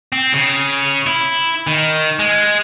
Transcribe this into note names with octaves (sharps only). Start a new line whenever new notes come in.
C4
C#3
E4
D#3
G#3